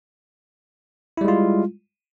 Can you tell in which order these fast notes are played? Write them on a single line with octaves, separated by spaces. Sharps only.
E4 G3 G#3 F4